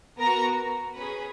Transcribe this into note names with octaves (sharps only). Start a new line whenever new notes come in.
B3 F#4 A#4 A#5
C#4 G#4 B4 B5